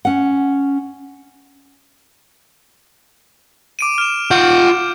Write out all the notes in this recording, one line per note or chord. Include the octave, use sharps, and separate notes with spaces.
C#4 F#5
D6 D7 D#7
F6 E7
F4 F#5 G6